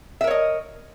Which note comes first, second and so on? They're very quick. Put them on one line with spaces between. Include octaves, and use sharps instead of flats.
E5 A#4 C#5 D#5